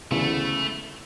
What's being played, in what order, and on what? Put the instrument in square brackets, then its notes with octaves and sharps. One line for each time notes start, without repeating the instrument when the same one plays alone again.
[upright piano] D2 C#3 E3 B3 E4 [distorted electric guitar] A3